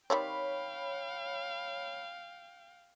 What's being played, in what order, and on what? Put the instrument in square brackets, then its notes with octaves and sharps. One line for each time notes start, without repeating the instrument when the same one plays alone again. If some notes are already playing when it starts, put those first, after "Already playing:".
[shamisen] D#3 G3 C4 [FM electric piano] C#5 B5 [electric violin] F5 G5